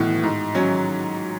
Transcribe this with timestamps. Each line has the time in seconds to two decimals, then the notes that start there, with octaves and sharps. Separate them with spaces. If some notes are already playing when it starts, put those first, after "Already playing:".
Already playing: B1 A2 E3 B3 F#4
0.24 G#2
0.55 F#3 C#4